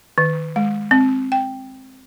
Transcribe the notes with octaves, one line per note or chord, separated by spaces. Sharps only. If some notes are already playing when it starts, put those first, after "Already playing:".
D#3
G#3
C4
G5